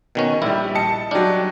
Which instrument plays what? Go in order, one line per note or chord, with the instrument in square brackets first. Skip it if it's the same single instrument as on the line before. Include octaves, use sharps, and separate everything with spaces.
[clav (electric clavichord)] B2 D#3 C#4
[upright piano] A#1 G3 [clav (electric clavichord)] E4
[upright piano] D#5 A5 C#7
[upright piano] F#3 G3 [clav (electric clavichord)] D4